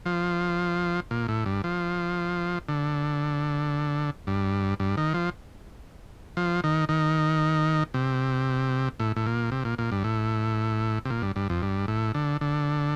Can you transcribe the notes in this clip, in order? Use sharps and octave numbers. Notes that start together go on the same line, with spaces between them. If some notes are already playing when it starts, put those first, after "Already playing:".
F3
A#2
A2
G2
F3
D3
G2
G2
D#3
F3
F3
D#3
D#3
C3
A2
A2
A#2
C3
A#2
A#2
G2
A2
C3
A#2
G2
G2
F2
G2
A2
D3
D3